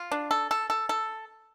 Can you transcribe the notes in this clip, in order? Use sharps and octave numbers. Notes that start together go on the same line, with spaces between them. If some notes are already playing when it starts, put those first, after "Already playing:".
Already playing: F4
D4
A4
A4
A4
A4